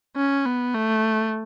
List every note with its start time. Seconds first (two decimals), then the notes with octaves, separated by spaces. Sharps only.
0.16 C#4
0.45 B3
0.74 A3